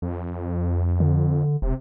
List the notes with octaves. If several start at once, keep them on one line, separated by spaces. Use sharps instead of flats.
F2
D3
E1 C3